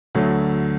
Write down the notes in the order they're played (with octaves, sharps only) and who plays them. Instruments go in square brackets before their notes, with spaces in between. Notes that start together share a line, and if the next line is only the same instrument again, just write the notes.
[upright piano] D2 D3 F#3 A3